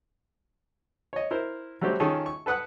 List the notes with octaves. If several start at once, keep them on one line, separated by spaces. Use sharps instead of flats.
C#5 D#5
E4 A#4 C5
F#3 G3 A3 C4 C#4 G4
D#3 C#4 D#4 F4 G#4 A4
C#6
A4 B4 F#5 D#6 F#6